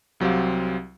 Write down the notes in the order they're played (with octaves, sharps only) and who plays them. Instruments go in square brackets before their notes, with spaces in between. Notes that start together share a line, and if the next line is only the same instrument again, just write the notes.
[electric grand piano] C2 F#3 C4 G4 F5